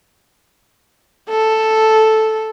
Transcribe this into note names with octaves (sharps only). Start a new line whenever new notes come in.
A4